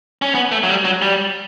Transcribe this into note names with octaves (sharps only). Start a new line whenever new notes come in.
C#4
B3
A3
F#3
G3
F#3
G3